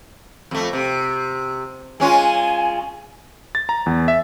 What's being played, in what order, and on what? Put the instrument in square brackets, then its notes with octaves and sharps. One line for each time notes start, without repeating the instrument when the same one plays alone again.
[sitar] F2 A3
C3
[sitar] G#3 C#4 F4 [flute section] G#5
[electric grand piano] A6
A#5
E2
E5